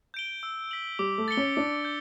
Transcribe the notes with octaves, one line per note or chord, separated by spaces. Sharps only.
G6 D7 G7
E6
B6 F#7
G3 D6
A3
A6 C#7 G7
C#4
D4 D6
G6